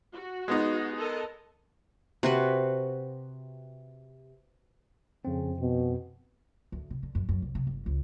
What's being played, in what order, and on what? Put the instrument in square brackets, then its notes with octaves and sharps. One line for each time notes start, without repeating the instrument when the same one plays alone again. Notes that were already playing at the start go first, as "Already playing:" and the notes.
[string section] F#4
[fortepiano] G#3 B3 D#4
[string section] A4 A#4 D#5
[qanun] C3 F#4 B4
[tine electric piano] F2 C4 [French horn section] C#3
[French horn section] B2
[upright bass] D2
C3
D3
F#2
F#2
C2
C3
G1
C#2